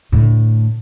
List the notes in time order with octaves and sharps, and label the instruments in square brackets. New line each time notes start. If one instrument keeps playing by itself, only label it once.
[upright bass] A2 D3